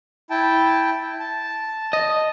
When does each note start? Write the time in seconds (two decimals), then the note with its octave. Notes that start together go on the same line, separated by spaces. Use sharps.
0.30 E4 G5 A5
1.20 A5
1.93 D#5